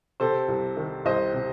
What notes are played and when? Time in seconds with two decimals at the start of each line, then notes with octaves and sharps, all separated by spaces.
0.20 C3 A4 C5
0.48 C2
0.77 D#3
1.05 C2 C5 D#5
1.34 C3